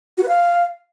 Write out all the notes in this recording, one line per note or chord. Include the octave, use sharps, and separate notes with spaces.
F#4
B4
F5